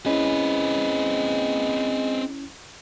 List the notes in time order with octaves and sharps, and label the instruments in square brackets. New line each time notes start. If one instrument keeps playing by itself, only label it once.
[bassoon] G#3 [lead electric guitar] C4 B4 [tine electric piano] C#4 E4